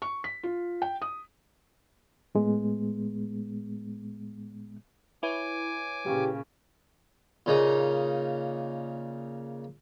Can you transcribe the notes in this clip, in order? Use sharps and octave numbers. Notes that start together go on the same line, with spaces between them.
C#6
B6
F4
G5
D#6
A2 G#3 B3
E4 B4 C#5 G#5 D6
A#2 C#3 G4
A#2 C#3 D#4